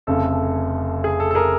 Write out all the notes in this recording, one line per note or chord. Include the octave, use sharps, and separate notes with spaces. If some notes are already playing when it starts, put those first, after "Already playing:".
F1 F2 C#3 A4
G#4
A4
A4
G#4 A#4